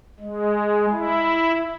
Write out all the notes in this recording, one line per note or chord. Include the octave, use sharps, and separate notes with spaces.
G#3
E4